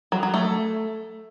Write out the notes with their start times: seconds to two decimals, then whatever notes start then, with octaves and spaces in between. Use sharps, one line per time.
0.12 F#3
0.23 F#3
0.34 A3